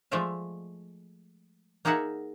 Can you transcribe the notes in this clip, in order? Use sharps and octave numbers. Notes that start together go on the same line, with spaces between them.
F3 G#3 A3 D5 E5 F5
A#3 D#4 G#4 A#4 E5 F#5